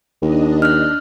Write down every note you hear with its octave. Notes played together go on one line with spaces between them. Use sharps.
D#2 D4 D#5
F6 F#6